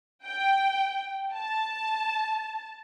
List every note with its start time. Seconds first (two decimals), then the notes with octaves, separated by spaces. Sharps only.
0.24 G5
1.34 A5